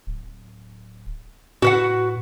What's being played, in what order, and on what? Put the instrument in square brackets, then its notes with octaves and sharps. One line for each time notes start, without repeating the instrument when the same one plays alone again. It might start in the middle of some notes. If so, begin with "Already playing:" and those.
[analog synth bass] D1
[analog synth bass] A2 [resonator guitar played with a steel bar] F#4 B4 F#5